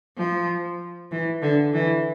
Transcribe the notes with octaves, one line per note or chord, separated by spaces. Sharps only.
F3
E3
D3
E3